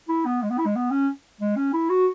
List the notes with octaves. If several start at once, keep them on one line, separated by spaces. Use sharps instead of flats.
E4
B3
G#3
B3
E4
G#3
B3
C#4
G#3
C#4
E4
F#4